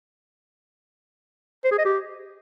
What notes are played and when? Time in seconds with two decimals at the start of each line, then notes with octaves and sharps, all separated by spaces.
1.64 C5
1.71 G#4
1.78 D#5
1.85 G4